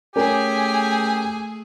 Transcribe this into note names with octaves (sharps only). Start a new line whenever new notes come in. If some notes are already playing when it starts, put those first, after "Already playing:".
A3 C#4 G4 G#4 A#4 G#5